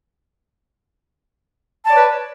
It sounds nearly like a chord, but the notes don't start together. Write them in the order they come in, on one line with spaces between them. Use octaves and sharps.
A5 D5 C#5 B4